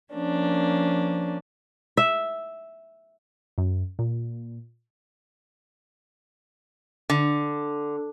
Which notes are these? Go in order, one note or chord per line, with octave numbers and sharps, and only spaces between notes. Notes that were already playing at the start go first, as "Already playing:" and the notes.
F3 A#3 C#4 D4
E5
F#2
A#2
D3